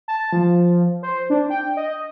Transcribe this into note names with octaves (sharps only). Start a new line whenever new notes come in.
A5
F3
C5
D4
G5
D#5